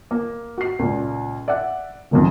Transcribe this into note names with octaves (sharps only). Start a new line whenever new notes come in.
A#3
F#4 C7
C#2 A#2
D5 E5 F#5
D#1 B1 F2